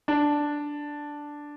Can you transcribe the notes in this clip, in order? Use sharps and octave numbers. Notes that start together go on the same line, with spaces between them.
D4